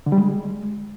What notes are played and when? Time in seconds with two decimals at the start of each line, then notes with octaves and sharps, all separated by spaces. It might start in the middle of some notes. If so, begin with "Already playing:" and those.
0.06 D3
0.12 G3
0.18 G#3